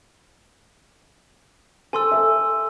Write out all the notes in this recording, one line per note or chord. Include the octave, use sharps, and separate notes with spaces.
A4 G#5 C6 E6
A4 E5